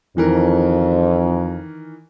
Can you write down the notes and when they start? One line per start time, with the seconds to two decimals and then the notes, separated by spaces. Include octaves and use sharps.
0.17 F2 D#3 E3 A#4